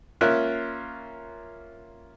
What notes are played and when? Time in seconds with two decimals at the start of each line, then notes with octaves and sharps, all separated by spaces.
0.21 A#3 C#4 F4 A#4 E5 F#6